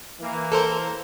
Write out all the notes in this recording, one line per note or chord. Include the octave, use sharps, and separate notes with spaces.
E3 A#3
A4 A#4 C5